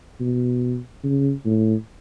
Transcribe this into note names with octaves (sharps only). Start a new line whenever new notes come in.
B2
C#3
A2